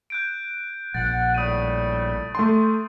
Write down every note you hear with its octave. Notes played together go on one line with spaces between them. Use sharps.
F#6 G6 D7
A#1 F#5 A6
A2 G3 A3 D#6 D#7
A3 C6